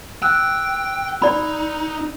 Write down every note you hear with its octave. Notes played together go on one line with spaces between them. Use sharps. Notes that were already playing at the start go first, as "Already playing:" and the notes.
G5 E6 F#6
D#4 D5 B5